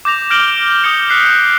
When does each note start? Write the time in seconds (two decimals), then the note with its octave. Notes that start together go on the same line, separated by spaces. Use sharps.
0.05 D6 G6 A#6 F7
0.30 F6 G6 A#6 D7 F#7 G7
0.84 D#6 G6 C#7
1.10 F#6 B6 C7